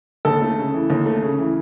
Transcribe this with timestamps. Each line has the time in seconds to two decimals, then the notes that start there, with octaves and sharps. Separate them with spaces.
0.25 D#2 A4
0.42 A3
0.58 C#3
0.74 E3
0.90 D#2
1.06 A3
1.22 C#3
1.39 E3